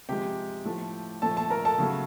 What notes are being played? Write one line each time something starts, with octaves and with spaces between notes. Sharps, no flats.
C3 F3 G#3 G4 G5
A2 F3 A3
A#2 F3 A3 A4 A5
A4 A5
A#4 A#5
A4 A5
C#3 F#3 A3